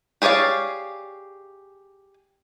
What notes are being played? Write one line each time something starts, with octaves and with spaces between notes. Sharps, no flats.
G4 G#4 C#5 D5 F5